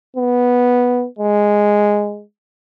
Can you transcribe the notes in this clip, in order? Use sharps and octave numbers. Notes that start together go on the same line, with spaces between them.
B3
G#3